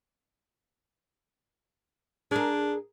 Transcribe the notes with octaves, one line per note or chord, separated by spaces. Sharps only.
D4 G#4 A#4